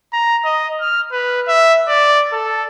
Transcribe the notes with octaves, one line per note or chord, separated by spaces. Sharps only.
A#5
D#5
F6
B4
E5
D5
A4